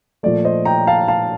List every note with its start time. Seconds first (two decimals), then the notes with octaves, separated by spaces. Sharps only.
0.23 A#2 F3 A3 D5
0.45 C5 D#5
0.65 G5 A#5
0.87 F5 A5
1.08 F5 A5